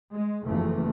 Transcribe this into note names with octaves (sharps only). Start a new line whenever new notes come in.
G#3
F#1 E2 E3 F3 A3